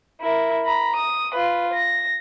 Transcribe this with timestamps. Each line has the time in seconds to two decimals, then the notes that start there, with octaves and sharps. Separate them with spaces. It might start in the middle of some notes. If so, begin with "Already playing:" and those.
0.21 E4 A#4
0.65 A#5 B5
0.96 D#6
1.35 F4 B4
1.74 A#6